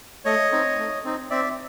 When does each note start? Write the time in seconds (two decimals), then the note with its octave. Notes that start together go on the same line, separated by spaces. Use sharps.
0.25 A3 C#5 D#5
0.52 C4 D#4
0.78 A3
1.04 C4 D#4
1.30 C4 D5 E5